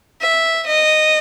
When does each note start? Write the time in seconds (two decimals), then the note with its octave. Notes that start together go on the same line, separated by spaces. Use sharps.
0.21 E5
0.67 D#5